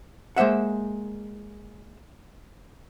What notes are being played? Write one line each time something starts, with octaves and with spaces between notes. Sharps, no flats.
G#3 A#3 C5 E5 F#5